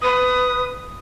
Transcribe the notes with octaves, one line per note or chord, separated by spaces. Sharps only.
B4 D#6